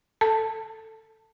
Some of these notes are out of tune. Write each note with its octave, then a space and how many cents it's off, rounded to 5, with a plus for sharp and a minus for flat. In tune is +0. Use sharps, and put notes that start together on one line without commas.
A4 +10 A5 +5